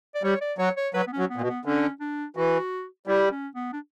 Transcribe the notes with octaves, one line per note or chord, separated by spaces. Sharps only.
D5
G3 C#5
D5
F#3 C#5
C#5
F#3 B4
B3
C#4
F#3
B3
A#2
B2
B3
D3 C#4
D4
E3 F#4
G3 E4
C#4
B3
D4